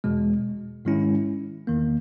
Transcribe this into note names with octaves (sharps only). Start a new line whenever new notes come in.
E2 B2 G#3
G#2 D#3 G#3 C#4 E4
E2 D#3 A#3